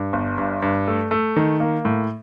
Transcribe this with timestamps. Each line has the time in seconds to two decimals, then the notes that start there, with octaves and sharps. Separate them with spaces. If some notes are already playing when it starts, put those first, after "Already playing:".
Already playing: G2
0.13 G1
0.38 G2
0.62 G2
0.88 A3
1.11 A3
1.36 D#3
1.60 A#3
1.85 A2